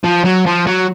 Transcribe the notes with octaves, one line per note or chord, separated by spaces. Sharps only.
F3
F#3
F3
F#3